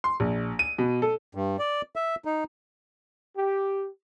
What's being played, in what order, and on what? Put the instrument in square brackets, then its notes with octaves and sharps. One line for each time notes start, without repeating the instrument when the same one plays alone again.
[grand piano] C6
A#1
D#7
B2
A4
[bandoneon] G2
D5
E5
D#4
[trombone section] G4